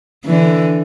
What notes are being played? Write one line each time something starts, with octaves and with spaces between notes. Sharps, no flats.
D3 E3